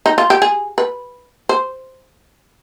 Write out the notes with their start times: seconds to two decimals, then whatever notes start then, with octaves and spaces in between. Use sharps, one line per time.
0.06 D#4
0.18 F4
0.30 G4
0.42 G#4
0.78 B4
1.49 C5